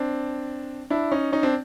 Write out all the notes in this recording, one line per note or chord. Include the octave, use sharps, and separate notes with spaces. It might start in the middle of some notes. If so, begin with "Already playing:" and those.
Already playing: C4 D4
D4 E4
C#4 D#4
C#4 D#4
C4 D4